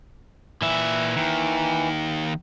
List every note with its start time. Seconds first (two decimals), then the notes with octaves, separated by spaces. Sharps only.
0.62 A#2 E3 E5
1.17 D#2 D#3